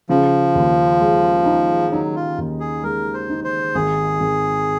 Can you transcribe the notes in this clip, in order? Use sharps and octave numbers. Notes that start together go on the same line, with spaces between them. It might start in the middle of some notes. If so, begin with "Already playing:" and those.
C#3 F3
D#2
G#3
D#4
F#3 D#4
F4
D#2
G#4
G#3 A#4
C5
D#4
C5
G#1 G#4
G#1